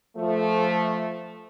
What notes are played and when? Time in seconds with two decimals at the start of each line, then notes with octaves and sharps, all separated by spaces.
0.16 F3 A3